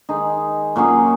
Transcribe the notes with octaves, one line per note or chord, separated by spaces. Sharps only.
D#3 G#3 D#4 G#4
A#2 F#3 C#4 G#4